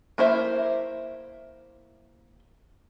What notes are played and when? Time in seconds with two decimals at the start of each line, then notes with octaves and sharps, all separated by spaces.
0.18 A#3 E4 C5 E5